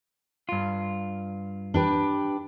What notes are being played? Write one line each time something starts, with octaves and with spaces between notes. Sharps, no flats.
G2 F4
D4 G4 B4